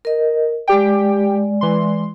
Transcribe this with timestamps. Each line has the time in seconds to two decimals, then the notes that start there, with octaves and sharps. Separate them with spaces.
0.05 A#4 D#5
0.68 G#3 G4 D5 G5
1.61 E3 C6